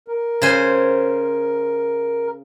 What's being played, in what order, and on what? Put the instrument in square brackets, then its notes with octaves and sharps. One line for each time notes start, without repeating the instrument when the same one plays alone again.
[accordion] A#4
[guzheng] C#3 C5 G#5